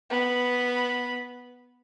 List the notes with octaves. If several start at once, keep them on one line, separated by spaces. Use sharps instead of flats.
B3 B5